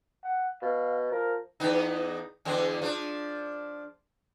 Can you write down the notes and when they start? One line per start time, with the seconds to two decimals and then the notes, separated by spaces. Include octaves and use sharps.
0.24 F#5
0.62 B2 F5
1.11 F3 A#4
1.60 E2 B3 D#4
2.45 E2 D3 G#3
2.82 F3 D4